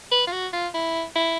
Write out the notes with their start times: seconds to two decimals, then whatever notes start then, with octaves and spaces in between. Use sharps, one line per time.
0.12 B4
0.27 F4
0.32 F#4
0.53 F4
0.74 E4
1.15 E4